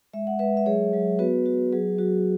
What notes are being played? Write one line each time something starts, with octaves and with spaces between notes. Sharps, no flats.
G#3 E5
F#5
G#3 B4 E5
E5
F#3 G#4 C#5
F#3
B3 F#4 B4
F#4
F#3 G#4
F#3 F#4